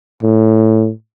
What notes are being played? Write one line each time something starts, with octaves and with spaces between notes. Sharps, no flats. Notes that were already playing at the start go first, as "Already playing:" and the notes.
A2